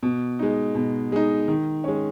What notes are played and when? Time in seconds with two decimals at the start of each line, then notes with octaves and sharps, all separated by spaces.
0.03 B2
0.39 G#3 D#4
0.75 B2
1.12 G#3 D#4
1.48 D#3
1.84 G#3 C#4